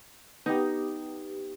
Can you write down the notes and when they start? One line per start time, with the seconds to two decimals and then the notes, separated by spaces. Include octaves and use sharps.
0.46 B3 D#4 G4